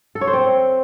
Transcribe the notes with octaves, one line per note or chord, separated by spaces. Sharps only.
A4
C#5
C5
C4